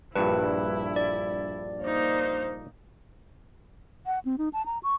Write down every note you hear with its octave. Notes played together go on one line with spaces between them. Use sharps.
A#1 G2 E4 B4
D5
A#3 D#4 C5
F#5
C4
D#4
A5
A#5
C#6